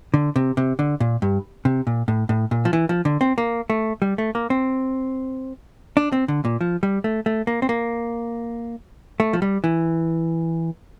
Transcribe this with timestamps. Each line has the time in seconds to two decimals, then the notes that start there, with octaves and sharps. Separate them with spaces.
0.14 D3
0.36 C3
0.57 C3
0.79 D3
1.00 A#2
1.22 G2
1.65 C3
1.87 A#2
2.08 A2
2.29 A2
2.51 A#2
2.65 F3
2.73 E3
2.89 F3
3.05 D3
3.21 C4
3.38 A#3
3.70 A3
4.02 G3
4.18 A3
4.35 A#3
4.50 C4
5.97 D4
6.12 C4
6.28 D3
6.45 A#2
6.61 F3
6.83 G3
7.04 A3
7.26 A3
7.47 A#3
7.62 C4
7.69 A#3
9.20 A3
9.33 F3
9.42 G3
9.64 E3